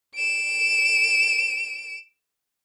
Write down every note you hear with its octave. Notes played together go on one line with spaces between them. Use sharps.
D7 E7